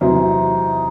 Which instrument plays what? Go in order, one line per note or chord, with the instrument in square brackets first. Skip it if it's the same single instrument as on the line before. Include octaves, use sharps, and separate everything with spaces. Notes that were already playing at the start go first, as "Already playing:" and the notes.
[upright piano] E2 C3 F#3 C4 E4 [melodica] D#4